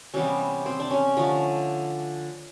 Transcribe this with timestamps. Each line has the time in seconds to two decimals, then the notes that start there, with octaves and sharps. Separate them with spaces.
0.14 C3 E3 G3 B3 C#4
0.66 C4
0.80 D4
0.91 C#4
1.17 D3 F3 A3